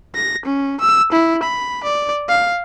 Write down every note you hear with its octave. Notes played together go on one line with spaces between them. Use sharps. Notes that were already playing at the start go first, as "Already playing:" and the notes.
A#6
C#4
E6
E4
B5
D5
F5